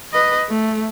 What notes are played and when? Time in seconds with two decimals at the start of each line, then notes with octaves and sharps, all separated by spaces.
0.13 B4 D#5
0.49 A3